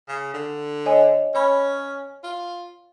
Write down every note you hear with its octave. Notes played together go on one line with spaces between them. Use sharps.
C#3
D3
C#5 D#5 G#5
C#4 C#5 B5
F4